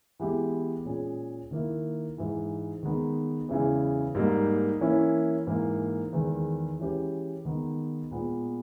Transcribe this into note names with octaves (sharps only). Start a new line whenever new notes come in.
E3 G#3 B3 G4
A#2 G#3 C#4 G#4
D#3 A#3 E4
G#2 E3 G#3
D#3 G#3 B3 D#4
E2 C#3 E3 G#3
G#2 G3 A#3 D#4
E3 A#3 C#4 E4
G#2 E3 A#3
E2 D#3 G#3
E3 G#3 C#4 G4 B4
D#3 G#3 B3 D#4
A#2 G#3 B3